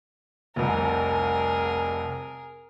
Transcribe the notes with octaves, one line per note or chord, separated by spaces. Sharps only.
F1 C2 G#4 A#4